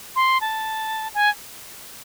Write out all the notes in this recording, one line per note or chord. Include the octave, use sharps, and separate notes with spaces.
C6
A5
G#5